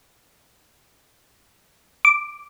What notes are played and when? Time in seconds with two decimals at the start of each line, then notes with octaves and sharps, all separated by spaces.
2.05 D6